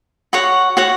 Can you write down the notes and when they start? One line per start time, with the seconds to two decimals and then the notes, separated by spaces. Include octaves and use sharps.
0.33 F#4 C#5 F#5
0.77 F#4 C#5 F#5